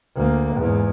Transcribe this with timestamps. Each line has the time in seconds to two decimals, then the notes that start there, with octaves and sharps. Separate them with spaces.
0.16 D2 A#3
0.57 E2 G#2